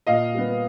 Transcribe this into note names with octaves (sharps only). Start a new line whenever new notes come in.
A#2 D#5 F5
G3 B3